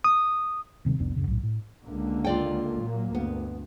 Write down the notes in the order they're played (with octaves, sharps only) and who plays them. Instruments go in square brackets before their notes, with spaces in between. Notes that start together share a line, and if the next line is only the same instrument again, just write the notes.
[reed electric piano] D#6
[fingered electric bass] D#1 C3 D#3 G3
F1 C2 B3 D4
D1 F#2 C#3
B1 A2
A2
[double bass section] C#2 D3 A#3
[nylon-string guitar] F4 D5 G5
[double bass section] A#2 F#3 A#3
[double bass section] D2 G2 [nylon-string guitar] B3